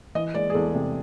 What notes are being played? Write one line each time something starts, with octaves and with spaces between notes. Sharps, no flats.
E3 D#5
G#3 D5
G#4
E2 A4
C3